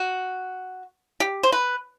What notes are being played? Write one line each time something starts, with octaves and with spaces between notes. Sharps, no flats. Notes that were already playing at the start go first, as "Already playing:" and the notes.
Already playing: F#4
G4
C5
B4